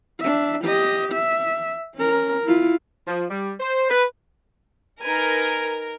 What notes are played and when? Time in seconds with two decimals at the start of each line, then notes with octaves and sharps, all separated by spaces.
0.20 D4 E5
0.64 G4 D#5
1.13 E5
1.95 C#4 A#4
2.44 E4 F4
3.07 F3
3.29 G3
3.60 C5
3.90 B4
5.02 D#4 A#4 B4 G#5